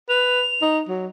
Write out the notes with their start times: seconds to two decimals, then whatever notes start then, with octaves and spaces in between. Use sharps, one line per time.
0.09 B4 F7
0.62 D#4
0.89 F#3